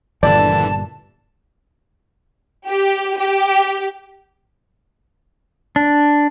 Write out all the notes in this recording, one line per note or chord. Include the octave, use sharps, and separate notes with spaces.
G1 G2 A#2 D3 E3 D5 A5
G4
G4
D4